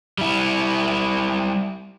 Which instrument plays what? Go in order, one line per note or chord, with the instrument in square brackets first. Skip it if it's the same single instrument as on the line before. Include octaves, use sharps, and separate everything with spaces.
[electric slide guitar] G3 E4